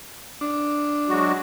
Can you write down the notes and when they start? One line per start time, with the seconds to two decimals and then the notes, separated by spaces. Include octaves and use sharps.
0.41 D4
1.09 F#3 G#3 F#4